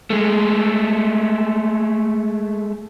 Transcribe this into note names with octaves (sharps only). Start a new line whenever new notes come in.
G#3 A3